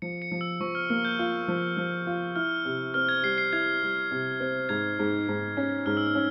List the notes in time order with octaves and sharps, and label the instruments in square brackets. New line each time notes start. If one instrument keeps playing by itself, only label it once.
[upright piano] F3 [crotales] C#7
[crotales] C#7
[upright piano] F3
[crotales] E6
[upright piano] F3 [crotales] C#6
[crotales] F6
[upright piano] A#3 [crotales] F6
[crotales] G6
[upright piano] F4
F3
F3
F4
[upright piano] E4 [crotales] F6
[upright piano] C3
[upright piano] C4 [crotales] F6
[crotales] G#6
[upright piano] G3 [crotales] C7
[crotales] C7
[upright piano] E4 [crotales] G#6
[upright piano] G3
C3
C4
[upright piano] G#2 [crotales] G#6
[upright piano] G#2
G#2
C#4
[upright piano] G#2 [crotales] F6
[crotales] E6
F6
[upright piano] C#4